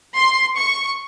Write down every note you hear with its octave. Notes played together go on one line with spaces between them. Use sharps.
C6
C#6